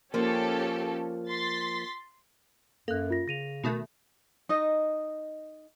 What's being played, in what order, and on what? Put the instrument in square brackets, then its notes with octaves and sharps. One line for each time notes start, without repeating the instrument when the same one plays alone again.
[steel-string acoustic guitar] F3 A#3 [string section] C#4 G4 A4
[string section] C6 A6 B6
[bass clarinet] F#2 [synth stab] A#3 [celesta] A4 F#6
[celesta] F4 A#6
[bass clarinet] C#3 [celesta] A#6 D#7 F7
[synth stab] B2 D#3 A3
[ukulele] D#4 D#5